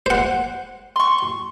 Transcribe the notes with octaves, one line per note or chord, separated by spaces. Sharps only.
C5 F#5
C6 C#6